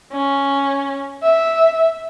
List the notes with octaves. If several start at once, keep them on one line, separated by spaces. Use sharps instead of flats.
C#4
E5